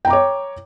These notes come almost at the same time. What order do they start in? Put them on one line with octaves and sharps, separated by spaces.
G5 A#5 D6 C#5